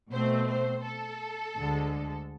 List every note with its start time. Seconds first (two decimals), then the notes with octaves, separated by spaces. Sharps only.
0.12 B2 A3 C4 C5
0.48 C5
0.84 A4
1.57 D2 D3 G#3